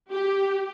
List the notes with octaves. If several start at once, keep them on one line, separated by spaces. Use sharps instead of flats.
G4